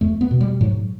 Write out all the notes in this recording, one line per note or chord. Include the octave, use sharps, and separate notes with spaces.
E2 A3
B3
B2
G3
G#2 F#3